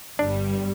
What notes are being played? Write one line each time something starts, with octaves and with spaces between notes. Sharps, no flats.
G1 G2 G3 D4